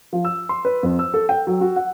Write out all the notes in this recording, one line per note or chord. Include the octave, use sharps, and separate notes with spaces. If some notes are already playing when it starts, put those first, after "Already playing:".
F3
E6
C6
B4
F2
E6
A4
G5
F#3
F#4
F#5